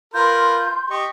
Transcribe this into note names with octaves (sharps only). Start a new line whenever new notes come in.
F4 A#4 B4 C6 G6
G4 D#5 C#6